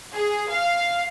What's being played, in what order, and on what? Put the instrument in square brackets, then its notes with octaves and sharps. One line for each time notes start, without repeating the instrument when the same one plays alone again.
[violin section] G#4
F5